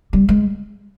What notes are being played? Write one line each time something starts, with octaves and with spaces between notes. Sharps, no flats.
G3
G#3